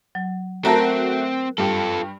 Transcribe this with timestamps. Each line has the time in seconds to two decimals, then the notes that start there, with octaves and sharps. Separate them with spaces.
0.15 F#3
0.65 A3 C4 F#4 A#4 A5 A#5
1.58 G2 F4 G4 A4